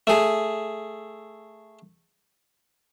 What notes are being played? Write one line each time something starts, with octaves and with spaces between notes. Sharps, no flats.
A3 G#4